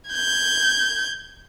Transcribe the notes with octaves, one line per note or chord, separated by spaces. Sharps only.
G6 G#6